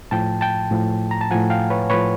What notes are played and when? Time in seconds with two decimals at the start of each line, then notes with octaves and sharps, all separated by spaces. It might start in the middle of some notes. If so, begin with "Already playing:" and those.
0.11 A2 F3 G5 A5
0.41 G5 A5
0.71 A2 F3
1.11 A#5
1.21 A5
1.31 A2 F3 F#5 G#5
1.50 F5 G5
1.70 B4 C#5
1.90 A2 F3 B4 C#5